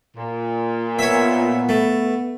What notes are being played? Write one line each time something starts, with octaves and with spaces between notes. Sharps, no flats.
A#2
B3 C#5 E5
A3